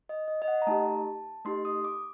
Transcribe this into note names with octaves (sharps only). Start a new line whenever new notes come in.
D#5
D#5
D#5
F#5
A#5
A3 D#4 G4 A5
A3 D#4 G4 C6
D#6
D6